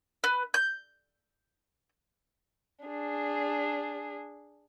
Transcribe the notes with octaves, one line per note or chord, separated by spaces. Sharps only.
B4
G6
D4 G#4